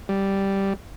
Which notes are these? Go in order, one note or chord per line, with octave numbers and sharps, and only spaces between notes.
G3